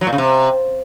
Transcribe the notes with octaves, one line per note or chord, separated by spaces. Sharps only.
F#3
A#2
C#3
C3